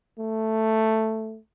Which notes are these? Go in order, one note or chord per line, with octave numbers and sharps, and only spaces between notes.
A3